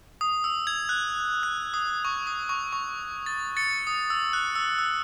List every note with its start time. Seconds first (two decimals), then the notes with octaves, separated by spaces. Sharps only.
0.21 D#6
0.44 E6
0.67 G#6
0.89 F#6
1.43 F#6
1.74 D#6
2.05 C#6
2.27 D#6
2.49 C#6
2.73 C#6
3.26 A6
3.57 A6 C#7
3.87 D#6
4.10 E6
4.33 F#6
4.56 E6
4.78 E6